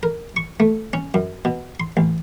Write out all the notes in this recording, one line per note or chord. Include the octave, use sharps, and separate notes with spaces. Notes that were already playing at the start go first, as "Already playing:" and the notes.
A#4
C#6
A3
C#4
F#2
B2
C6
A1